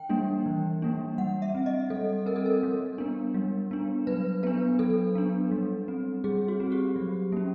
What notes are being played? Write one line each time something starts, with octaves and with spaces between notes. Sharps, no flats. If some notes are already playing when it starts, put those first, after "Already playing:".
Already playing: E3 G5
G3 A#3 D4
E3
G3 A#3 D4
G3 F#5
E5
C4
D#5
G3 A4
C4 A#4
A4
A#4
G3
B3 D4
G3
B3 D4
F#3 B4
B3 D4 B4
F#3 A4
B3 D4
G3
C4
G3 G#4
F#4
C4
G4
F#3
A#3 C#4